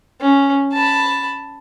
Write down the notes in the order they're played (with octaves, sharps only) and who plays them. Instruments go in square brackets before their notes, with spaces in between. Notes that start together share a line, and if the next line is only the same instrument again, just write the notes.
[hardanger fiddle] C#4
A5 B5